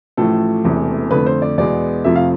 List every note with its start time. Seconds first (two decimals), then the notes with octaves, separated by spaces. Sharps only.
0.17 A1 A2 F3 A3 A4
0.64 E1 E2 C3 E3 A3
1.11 F2 D3 A3 B4
1.26 C5
1.42 D5
1.58 E2 B2 G#3 B3 D5
2.04 F2 C3 F3 A3 E5
2.16 F5